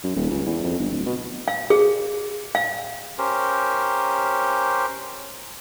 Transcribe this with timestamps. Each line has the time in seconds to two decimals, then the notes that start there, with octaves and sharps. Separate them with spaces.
0.04 F#2
0.16 D#1
0.30 C#2
0.46 E2
0.64 F2
0.80 G1
0.92 D1
1.06 B2
1.48 F5
1.70 G#4
2.55 F5
3.18 C#4 G4 A#4 C5